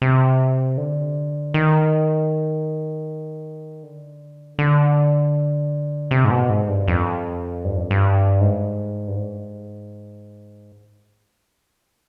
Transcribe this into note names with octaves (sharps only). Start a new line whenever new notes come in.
C3
D3
D#3
D3
D3
C3
G#2
B2
G#2
G2
F2
G2
F2
G2
G#2
G2
G#2